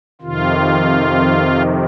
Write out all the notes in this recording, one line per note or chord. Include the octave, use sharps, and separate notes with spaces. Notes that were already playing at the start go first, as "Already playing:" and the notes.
F2 C3 D#3 F4